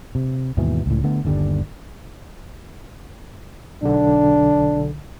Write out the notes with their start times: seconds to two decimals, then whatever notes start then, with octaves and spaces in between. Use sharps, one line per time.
0.15 C3
0.57 D#2 G#2 B2 E3
0.86 C#2 A2
1.04 D3 A3 B3
1.25 G1 D#2 D3 G3
3.82 B1 D3 D4